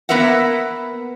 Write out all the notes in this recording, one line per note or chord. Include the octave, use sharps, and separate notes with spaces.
A#3 B3 A#4 B4 E5 F#5